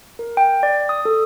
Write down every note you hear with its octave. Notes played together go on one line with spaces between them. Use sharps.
A#4
G5
D5
D#6
A4